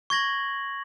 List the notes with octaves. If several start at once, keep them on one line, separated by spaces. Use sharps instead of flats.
C#6 G#6 A#6 F#7